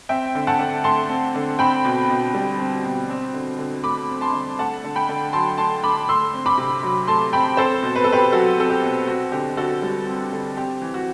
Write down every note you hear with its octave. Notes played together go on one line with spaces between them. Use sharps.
C4 E5 G5
D3
F#5 A5
D3
A3 A5 C6
C4
D3
C4 G5 B5
B2
B2
G3
C4
B2
C4
D3
D3
A3 B5 D6
C4
A5 C6
D3
A3 F#5 A5
D3
G5 B5
D3
F#3 A5 C6
A3 A5 C6
D3 B5 D6
A3 C6 E6
C4
B5 D6
C3
F#3
A3 A5 C6
C4 G5 B5
C4 A4 C5
B2
B4
B2 A4
G4 B4
F#3 F#4 A4
C4 A4
G4
B2
C4 F#4
D3 G4
D3 F#4 A4
G3
C4
D3
C4 G4
E3
F#4